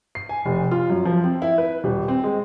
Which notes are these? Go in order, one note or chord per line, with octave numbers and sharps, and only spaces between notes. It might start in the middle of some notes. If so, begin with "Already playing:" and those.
C7
G#5
F1
F4
F#2
F3
C4
E4
B4
D#1
C4
G#3